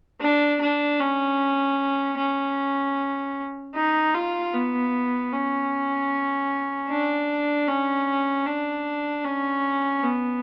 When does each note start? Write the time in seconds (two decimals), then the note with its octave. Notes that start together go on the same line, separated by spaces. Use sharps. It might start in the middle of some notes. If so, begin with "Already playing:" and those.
0.21 D4
0.61 D4
1.00 C#4
2.18 C#4
3.75 D#4
4.14 F4
4.53 B3
5.32 C#4
6.90 D4
7.68 C#4
8.46 D4
9.25 C#4
10.04 B3